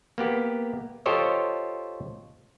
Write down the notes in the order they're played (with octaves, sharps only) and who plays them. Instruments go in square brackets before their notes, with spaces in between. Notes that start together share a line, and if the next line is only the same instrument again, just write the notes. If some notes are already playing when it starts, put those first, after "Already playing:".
[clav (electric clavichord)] A#3 B3 G4
F4 G4 A4 C5 C#5 D#5